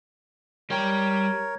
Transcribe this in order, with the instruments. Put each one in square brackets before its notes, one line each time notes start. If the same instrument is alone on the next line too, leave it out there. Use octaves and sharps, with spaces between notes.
[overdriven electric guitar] G3 G5 [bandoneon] A#4 C#5